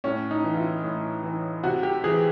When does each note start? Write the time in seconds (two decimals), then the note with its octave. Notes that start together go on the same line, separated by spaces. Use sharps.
0.04 A2 C#4
0.31 D#4
0.44 E3
0.54 F4
0.57 E4
0.84 A2
1.23 E3
1.63 C3 F#4
1.83 G4
2.04 E3 G#4